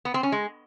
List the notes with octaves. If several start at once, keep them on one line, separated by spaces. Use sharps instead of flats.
B3
C4
C#4
G#3